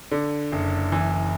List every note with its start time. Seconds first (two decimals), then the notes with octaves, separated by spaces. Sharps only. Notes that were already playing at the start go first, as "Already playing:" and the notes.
0.11 D3
0.52 F#1
0.92 E3